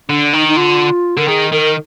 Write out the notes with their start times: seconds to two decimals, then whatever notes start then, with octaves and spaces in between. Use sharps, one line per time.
0.09 D3 D4
0.33 D#3 D#4
0.48 D#4
0.57 D3 F4
1.17 D3 A#4
1.28 D#3 G#4
1.51 D#3 A#4